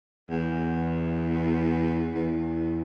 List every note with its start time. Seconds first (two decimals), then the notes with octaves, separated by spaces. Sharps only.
0.30 E2
2.15 E2